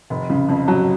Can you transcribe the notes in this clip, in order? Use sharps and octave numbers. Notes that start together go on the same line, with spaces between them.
F1
C#3
F2
F#3